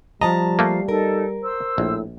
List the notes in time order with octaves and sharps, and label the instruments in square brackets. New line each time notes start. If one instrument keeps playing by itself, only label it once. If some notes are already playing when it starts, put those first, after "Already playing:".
[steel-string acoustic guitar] F3 A5 A#5 [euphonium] G3 [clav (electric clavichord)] D#5
[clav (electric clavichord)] A3 A#3 [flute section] F5
[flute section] D#4 A4 [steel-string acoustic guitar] A#4
[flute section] C5 E6
[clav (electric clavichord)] A#1 [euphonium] A2